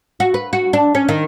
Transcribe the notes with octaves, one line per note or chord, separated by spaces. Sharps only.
F#4
B4
F#4
D4
C#4
D#3